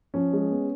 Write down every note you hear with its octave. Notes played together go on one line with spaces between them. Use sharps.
F3 C#4
G#3
B3